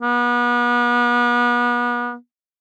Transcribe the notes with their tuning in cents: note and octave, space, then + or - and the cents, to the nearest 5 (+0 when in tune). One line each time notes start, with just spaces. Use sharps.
B3 -35